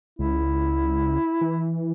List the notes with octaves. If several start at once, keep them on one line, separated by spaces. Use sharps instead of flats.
C#2 E4
E3